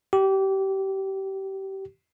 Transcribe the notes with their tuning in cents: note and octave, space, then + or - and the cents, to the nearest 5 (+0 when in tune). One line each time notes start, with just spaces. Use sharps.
G4 -25